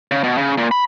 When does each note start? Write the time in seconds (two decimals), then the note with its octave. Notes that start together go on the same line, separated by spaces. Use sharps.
0.11 C#3
0.24 B2
0.38 C#3
0.58 A#2
0.71 B5